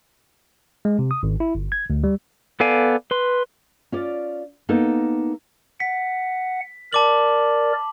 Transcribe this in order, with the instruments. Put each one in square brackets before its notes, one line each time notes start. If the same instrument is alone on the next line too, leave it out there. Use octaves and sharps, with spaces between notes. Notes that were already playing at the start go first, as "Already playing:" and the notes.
[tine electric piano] G#3
C3
D#6
G#1
E4
G1
G#6
D2
G3
[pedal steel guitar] B3 A4 D5 F5 G#5
B4 C6
[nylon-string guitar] C#4 F4 D5
A#3 B3 D#4 A4 A#4
[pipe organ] F#5 [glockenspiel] B6
[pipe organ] A#4 D5 [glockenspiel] A5 D6 F#7